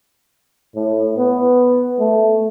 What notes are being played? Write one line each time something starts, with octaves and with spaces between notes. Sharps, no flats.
A2
B3
A3